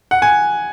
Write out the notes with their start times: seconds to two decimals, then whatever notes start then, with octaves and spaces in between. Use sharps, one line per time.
0.11 F#5
0.22 G#5